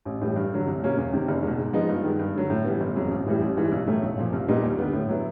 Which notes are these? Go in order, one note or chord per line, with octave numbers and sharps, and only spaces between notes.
A1
A2 E3 G3
G2
D3 F#3
C2
B2 F#3 A#3 C#4
E2
C3 D#3
F#1
E2 B2
G#2
F3 G#3 B3 D#4
G2
D#3 G#3 B3
G2
D3 F#3
A2
E3 G3 B3
G1
F2 C#3 F#3
A1
A2 E3 G3
A1
G#2 E3 G3
B1
A2 F#3 A3
B1
A#2 F3
C2
A#2 G3 B3 D#4
D#2
D3 G3 B3
A2
F#3 B3 E4